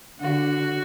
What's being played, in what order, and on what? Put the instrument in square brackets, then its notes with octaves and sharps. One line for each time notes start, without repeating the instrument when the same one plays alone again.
[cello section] D3 [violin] F#4